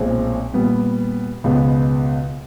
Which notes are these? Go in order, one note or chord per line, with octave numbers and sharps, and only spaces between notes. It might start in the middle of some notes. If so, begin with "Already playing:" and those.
Already playing: B1 A#2 F3 G#3 C4
A#2 G3 B3
C#2 B2 G#3 B3